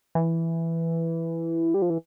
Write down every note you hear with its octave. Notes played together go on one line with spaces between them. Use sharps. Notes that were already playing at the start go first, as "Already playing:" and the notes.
E3
G3
F3
E3